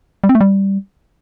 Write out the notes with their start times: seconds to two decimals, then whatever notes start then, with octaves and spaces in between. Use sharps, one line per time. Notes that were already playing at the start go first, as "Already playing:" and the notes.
0.24 G3
0.29 C4
0.35 A3
0.41 G3